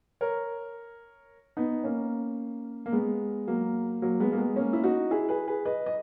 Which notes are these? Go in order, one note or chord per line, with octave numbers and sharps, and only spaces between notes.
A#4 C#5
B3 D#4
A#3 C#4
A#3
G#3 B3
F#3 A#3
F#3 A#3
G#3 B3
A#3
G#3 B3
A#3 C#4
E4
D#4 F#4
E4 G#4
G#4 B4
G#4 B4
B4 D#5
D#5